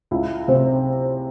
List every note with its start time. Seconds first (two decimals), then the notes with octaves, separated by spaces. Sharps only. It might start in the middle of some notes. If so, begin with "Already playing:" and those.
0.11 C#2 E4
0.48 C3 C4